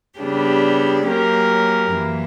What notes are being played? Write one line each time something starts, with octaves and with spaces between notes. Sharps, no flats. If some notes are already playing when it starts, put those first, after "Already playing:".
C#3 G3 B3 D4 G4
F#3 A#3 C#4 G4 A#4
F#2 E3 A#3